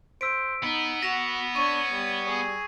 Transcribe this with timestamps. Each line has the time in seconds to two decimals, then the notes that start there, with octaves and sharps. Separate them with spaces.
0.21 C5 E6 B6 D7
0.63 B3 D#4
1.02 F#4 A#6 E7 F7
1.55 D4 C#5 C#6 D#7
1.92 G3
2.28 G#4